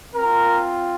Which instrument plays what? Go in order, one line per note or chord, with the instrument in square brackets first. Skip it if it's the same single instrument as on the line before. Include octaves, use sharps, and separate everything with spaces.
[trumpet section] C4 F4 A#4